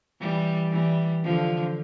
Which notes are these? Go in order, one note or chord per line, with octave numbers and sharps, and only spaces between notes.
E3 G3
E3 G3
D3 F3